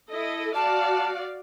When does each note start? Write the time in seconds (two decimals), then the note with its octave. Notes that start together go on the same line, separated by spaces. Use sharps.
0.10 E4 A4 D#5
0.55 F#4 D5 F5 A5